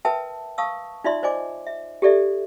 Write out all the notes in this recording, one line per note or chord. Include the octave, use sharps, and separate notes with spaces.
A#4 B4 E5 G5 A5
F5 A5 C#6 D#6 E6
D#4 F4 D5 E5 C6
C5 D5 D#5 G#5 D6
E5
G4 A4 D5 E5